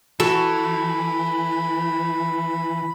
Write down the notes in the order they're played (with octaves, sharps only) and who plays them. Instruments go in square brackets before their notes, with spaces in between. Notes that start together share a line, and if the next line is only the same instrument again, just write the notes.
[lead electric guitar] E3 [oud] F#4 [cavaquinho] A4 [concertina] B5